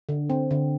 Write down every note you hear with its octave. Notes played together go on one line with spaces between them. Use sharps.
D3
C4
D3